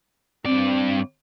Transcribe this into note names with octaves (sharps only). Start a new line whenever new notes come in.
G2 C4 D5